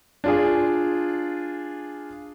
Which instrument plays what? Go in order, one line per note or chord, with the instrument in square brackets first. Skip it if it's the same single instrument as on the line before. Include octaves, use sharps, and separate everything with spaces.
[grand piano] D4 F4 G#4